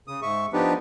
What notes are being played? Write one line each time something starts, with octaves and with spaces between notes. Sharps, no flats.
C#3 D#6
G#2 E5 C#6
F3 B3 D4 D#4 G4 B4